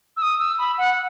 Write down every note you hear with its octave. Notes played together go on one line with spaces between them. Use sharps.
E6
D#6
E6
B5
F#5